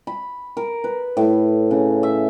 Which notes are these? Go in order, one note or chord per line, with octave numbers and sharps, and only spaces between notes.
B5
A#4
B4
A2
C#3
E5